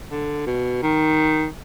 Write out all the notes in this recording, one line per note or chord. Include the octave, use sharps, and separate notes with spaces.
D3
B2
D#3